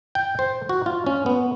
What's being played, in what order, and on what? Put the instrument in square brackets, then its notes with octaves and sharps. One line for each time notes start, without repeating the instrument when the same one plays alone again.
[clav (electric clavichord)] G5
C5
F#4
F4
C#4
B3